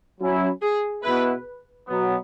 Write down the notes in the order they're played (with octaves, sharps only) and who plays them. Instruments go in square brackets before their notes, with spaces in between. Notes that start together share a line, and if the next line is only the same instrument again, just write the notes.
[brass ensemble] F#3 C#4 E4
[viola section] G#4
[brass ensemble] B2 B3 E4 [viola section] B4
[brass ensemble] B2 F#3 B3